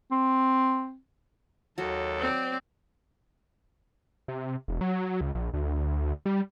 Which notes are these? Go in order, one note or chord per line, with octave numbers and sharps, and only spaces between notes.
C4
D#2 F#3 F#4 A4
C4 D5
C3
E1
F#3
C#2
A#1
D2
G3